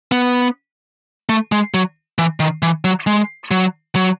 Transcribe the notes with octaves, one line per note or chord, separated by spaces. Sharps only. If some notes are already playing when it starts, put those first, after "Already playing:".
B3
A3
G#3
F#3
E3
D#3
E3
F#3
G#3
F#3
F#3